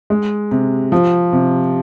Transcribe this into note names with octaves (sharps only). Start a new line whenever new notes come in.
G#3
C3
F3
C3